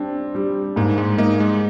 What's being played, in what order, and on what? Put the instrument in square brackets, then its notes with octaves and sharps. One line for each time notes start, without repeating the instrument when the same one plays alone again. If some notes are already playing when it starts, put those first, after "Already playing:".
Already playing: [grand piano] G3 D4 [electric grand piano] C4
[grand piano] G3
[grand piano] G#2 [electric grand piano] A#3
[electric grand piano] G#3
[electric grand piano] A#3 [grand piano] D#4
[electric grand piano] G#3